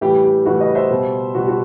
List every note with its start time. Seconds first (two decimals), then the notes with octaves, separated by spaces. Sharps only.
0.01 A2 E3 G3 G4
0.24 G4
0.46 A2 E3 G3 F#4
0.61 B4 D#5
0.75 C5 E5
0.90 B2 G3
1.35 B2 G3 F#4
1.48 F#4